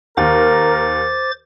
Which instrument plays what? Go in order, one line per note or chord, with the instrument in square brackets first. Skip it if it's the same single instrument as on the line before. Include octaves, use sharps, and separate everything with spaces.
[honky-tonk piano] D#2 [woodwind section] A#4 [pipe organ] C5 D6 A6